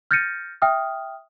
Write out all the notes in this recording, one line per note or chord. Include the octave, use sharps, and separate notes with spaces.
F6 G6 A6 A#6 C#7 D#7
E5 G5 D#6 F6